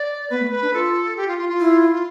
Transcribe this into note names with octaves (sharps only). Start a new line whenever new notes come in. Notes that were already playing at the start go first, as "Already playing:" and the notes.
Already playing: D5
B3 B4
A3
B4
D4
F4 A4
G4
F4
F4
F4
E4
F4